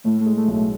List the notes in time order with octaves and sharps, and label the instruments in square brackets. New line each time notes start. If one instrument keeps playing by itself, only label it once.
[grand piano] A2 [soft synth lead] A3
[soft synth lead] A3
[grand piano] G#3
[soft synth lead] A3
[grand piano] B1
[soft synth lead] A3